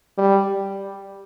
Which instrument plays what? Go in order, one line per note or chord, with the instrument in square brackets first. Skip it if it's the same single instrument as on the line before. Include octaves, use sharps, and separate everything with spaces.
[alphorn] G3